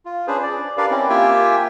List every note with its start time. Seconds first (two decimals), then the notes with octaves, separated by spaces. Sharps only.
0.05 F4
0.27 C#4 D4 G#4 B4 C5
0.43 D5
0.77 D4 G4 A#4 B4 D5 F5
0.91 C4 C#4 E4
1.09 A#3 F4 G4 E5 G5 G#5